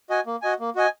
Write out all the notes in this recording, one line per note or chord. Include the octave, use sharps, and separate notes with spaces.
F#4 D#5 G#5
A#3
F#4 D#5 G#5
A#3
F#4 D#5 G#5